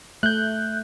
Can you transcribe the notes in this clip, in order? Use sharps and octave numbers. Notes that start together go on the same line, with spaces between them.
A3 F#6 G6